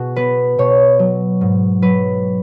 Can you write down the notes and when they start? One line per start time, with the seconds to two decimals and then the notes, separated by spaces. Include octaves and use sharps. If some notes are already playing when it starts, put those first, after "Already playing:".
Already playing: B2 F#4 G#4
0.16 B3 B4
0.58 B2 C#5
0.99 F#3
1.41 G#2
1.82 F#3 B4